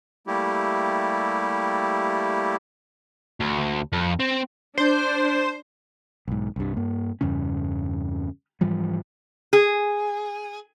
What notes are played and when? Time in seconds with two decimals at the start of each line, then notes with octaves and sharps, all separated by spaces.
0.27 G3 A3 A#3 E4 G4
3.40 D2
3.92 F2
4.19 C4
4.78 D4 C5
6.28 B1 G#2
6.56 C2 G2
6.77 G2 A#3
7.21 E2 G2 C#3 C#4
8.61 G#2 E3 F3 G3
9.53 G#4